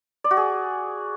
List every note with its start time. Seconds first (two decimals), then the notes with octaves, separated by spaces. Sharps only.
0.24 D5
0.31 F#4
0.37 G#4